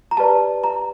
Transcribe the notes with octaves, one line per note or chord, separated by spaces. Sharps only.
A#5
G4 B4 D5 A5
A#5